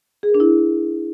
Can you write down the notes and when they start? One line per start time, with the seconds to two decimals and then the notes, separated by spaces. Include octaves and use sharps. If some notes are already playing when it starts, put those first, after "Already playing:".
0.23 G#4
0.29 A#4
0.34 D4
0.40 E4